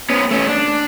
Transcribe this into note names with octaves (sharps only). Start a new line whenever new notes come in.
B3 C#4
A3 C#4
D4